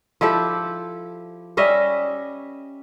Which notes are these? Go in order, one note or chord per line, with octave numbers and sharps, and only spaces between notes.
F3 E4 G4 A4
G3 C#4 D#5 E5